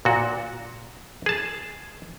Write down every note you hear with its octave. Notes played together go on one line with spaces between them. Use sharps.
A#2 F#4
G#4 A5